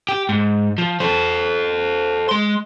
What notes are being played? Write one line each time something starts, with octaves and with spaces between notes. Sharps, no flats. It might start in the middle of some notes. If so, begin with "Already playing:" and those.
G4
G#2
F3
A4 C5
G#3 C6